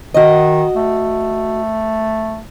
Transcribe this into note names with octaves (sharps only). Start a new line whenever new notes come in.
D#3 F#4 D#5
A3